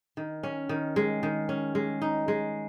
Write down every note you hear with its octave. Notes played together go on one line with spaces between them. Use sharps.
D#3
C#4
D#3
G#3
D#3
C#4
G#3
D#4
G#3